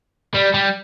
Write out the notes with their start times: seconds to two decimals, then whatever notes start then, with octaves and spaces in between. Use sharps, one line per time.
0.34 G3
0.54 G3